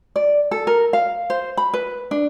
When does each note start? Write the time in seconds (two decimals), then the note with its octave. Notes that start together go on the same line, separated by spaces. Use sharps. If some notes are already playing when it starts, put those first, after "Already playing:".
0.16 D5
0.51 A4
0.67 A#4
0.93 F5
1.30 C5
1.57 B5
1.74 B4
2.11 D4